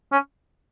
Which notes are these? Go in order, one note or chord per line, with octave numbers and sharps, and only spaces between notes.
C#4